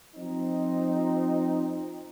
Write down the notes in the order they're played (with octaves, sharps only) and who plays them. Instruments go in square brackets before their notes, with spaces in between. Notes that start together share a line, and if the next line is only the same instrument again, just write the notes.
[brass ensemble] F3 C4 D#4